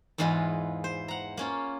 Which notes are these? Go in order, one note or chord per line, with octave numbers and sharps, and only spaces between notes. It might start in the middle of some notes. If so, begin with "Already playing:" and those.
E2 G#2 E3 G#3 F4
C5
F#5 A#5
A#3 C#4 F4